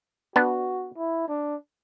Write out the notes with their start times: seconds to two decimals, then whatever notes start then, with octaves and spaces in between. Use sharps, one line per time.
0.36 B3 D4 F#4
0.97 E4
1.28 D4